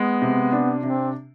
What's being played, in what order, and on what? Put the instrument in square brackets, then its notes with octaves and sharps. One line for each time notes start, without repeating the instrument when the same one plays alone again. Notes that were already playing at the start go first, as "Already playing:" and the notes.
Already playing: [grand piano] G#3 [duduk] B3
[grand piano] C3
D4
[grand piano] C3 [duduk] C4